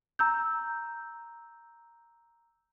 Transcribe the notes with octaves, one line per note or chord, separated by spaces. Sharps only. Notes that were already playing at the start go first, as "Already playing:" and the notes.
A#5 E6 G6